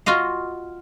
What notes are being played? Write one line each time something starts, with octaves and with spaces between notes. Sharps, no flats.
F4 F#4 D#5 F5